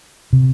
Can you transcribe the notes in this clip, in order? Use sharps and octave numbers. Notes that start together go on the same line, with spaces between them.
C3